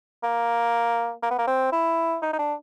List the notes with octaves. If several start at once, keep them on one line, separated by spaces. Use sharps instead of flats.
A#3
A#3
B3
A#3
C4
E4
D#4
D#4
D4